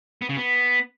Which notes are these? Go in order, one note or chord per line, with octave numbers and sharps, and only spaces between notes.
B3
C#3
B3